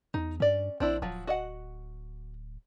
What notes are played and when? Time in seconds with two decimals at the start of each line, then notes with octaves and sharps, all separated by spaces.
0.14 E2 D#4
0.40 G2 C#4 D5
0.80 A#1 C4 D4 E4
1.02 D1 F3 F#3
1.27 F#4 D#5 F#5